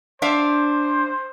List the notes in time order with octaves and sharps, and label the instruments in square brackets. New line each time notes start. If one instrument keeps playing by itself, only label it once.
[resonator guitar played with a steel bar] D4 E5 F5 [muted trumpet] C5